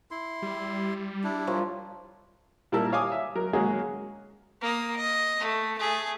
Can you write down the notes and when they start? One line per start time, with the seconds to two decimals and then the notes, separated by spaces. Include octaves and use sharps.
0.11 E4 C6
0.42 G3
1.24 D4 E4
1.47 F3 A#4 C#5
2.72 A#2 G3 E4 A#4 A5 E6
2.92 C#5 F5 G#5 D6 D#6
3.12 E5
3.35 F#3 A#4
3.53 F#3 G#3 A#3 C#4 F#4 G#4
4.62 A#3 D#6
4.97 D#5
5.40 A3
5.78 A3 G#4